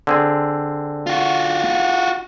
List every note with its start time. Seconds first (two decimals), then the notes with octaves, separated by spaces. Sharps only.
0.07 D3 C4 G#4
1.07 F4 F#4